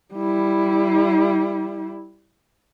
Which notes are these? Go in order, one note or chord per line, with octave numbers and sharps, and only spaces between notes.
G3 E4